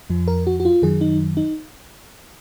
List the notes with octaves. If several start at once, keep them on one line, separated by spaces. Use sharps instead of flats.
F2 F3
A#4
F#4
F#4
F4
F#2 D#3 F#3 G#4
D#4
D#4